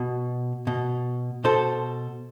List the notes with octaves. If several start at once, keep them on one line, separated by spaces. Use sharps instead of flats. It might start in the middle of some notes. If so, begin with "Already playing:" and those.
Already playing: B2
B2
B2 A4 C5